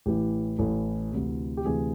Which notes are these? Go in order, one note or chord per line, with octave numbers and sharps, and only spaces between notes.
A1 A2 E3 G4
A1 A2 E3 A4
D2 C3 E3
G4
D2 C3 E3 G#4